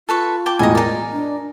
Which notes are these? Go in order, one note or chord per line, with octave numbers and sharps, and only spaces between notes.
F4 A4 B4 C#6
G5 A5 D6
E1 A2 D#5 G#5 A#5
D#4 A#4 D5 G#5
D4